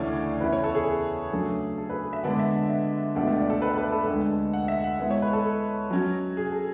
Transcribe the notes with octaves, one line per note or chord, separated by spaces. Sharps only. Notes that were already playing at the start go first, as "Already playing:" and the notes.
Already playing: D2 C#3 E3 A3 C#5 D5
E2 C#3 E3 B3 E4 B4
C#5
A4
G#4
C#3 F#3 A3 D4 A4
A4
B4
E5
D3 G#3 B3 D4 F#5
E5
F#5
E5
C#2 B2 A3 D4 F#5
E5
D5
A4
B4
B4
A4
D2 D3 G#3
F#5
E5
F#5
G#3 B3 E4
C#5
B4
A4
F#3 C#4 F#4
G#4
A4